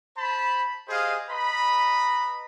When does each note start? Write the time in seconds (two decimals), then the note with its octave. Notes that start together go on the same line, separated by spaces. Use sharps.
0.17 C5 A5 B5
0.88 G4 G#4 C5 D#5 F5
1.29 B4 D#5 A#5 B5